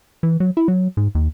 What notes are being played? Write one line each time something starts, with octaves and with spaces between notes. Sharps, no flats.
E3
F#3
E4
F#3
G#2
D#2